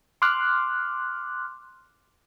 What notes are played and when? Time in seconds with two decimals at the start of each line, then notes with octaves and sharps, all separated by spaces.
0.22 C6 D6 F6 F#6